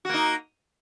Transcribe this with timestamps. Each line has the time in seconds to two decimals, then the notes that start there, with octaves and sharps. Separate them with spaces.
0.05 F#4
0.09 A#3
0.14 D#4